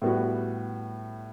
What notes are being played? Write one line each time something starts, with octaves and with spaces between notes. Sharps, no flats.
A2 G3 B3 F#4